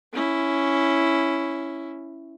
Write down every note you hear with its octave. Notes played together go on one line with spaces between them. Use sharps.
C#4 E4